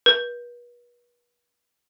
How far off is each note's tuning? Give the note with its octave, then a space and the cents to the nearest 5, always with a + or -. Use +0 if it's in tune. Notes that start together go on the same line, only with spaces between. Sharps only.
B4 -40